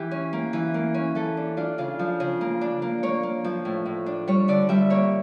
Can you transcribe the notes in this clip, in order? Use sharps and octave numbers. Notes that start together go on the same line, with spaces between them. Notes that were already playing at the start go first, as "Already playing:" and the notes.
Already playing: E3 G4
C#4
A#3
E3
A#3
C#4
E3 A4
D4
D4 F4
C#3 F4
F3
C#3
A#3
D4
A#3
A#3 C#5
A#3
F3
A2
A2
D4
G3 C#5
D3 D5
G3 E5
A#3 C#5